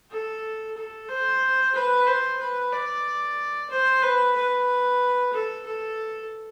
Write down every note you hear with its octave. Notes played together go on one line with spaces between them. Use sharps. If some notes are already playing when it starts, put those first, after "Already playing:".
A4
A4
C5
B4
C5
B4
D5
C5
B4
B4
A4
A4